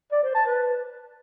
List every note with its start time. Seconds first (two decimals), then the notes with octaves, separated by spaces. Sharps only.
0.12 D5
0.23 C5
0.35 A5
0.46 B4